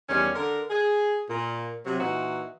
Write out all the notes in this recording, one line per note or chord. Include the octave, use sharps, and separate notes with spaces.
E2 D#3 G3 C#4
D3 A#4
G#4
A#2
C3 F#3
A#2 E3 D#4 F#4